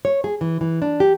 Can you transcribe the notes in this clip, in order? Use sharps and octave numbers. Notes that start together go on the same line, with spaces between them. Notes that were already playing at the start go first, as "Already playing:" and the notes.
C#5
G#4
E3
E3
D4
G4